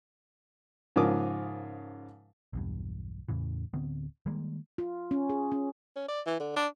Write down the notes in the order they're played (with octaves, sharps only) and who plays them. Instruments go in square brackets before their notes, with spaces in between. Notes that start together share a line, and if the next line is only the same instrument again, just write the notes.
[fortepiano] G#2 C#3 F3 A#4 D6 D#6
[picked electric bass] B1 E2 G2
E2 A2 C#3 E3
D1 D3 B3 C4
D#3 G3 G#3 A#3
[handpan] F4
C#4
G#4
C#4
[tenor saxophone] C#4
D5
E3
D3
D4